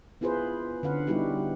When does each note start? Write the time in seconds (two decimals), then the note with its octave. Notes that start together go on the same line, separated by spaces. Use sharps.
0.21 B3 E4 F4 G#4 B4 C5
0.83 D3 C#4 B4 F5 F#5
1.07 G3 B3 D#4 E4 F#4 G4